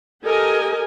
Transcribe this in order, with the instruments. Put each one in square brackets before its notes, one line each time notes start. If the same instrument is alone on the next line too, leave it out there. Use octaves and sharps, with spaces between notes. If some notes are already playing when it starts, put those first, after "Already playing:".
[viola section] G4 A4 A#4 D#5 G#5